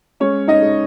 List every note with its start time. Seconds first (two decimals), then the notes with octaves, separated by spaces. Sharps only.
0.20 G#3 C#4 C#5
0.48 D#4 D#5
0.62 G#3